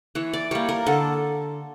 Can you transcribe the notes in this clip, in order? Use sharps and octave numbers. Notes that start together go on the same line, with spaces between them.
E3 C#5
D5
G3 A#3 C#5
A#4
D3 A4